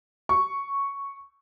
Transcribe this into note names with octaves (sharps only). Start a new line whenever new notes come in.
C#6